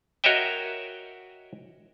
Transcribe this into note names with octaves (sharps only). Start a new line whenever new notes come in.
F#4 A#4 C#5 D#5 E5 G5